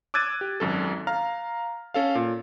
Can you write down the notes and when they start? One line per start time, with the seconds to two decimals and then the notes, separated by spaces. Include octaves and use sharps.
0.14 D6 E6 F#6 G#6 A6 D#7
0.41 G4
0.60 G#1 F#2 A4
1.07 F5 A#5 F6
1.94 C#4 A4 F5
2.15 A#2